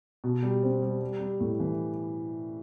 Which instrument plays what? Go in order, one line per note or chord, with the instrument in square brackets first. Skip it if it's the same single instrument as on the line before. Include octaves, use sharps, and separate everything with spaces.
[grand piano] B2
G3
C4
G3
G3
G3
A2
E3